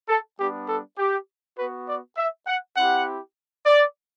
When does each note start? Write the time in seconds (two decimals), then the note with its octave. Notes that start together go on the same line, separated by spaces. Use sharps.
0.09 A4
0.38 G3 B3 D4 G4
0.68 A4
0.98 G4
1.58 B3 F#4 B4
1.87 D5
2.17 E5
2.47 F#5
2.77 C4 E4 G4 F#5
3.66 D5